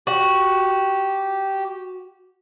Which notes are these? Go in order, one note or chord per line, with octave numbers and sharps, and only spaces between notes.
F#4 G4